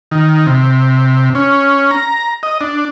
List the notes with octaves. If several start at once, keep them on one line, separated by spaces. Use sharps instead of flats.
D#3
C3
C#4
A#5
D#5
D4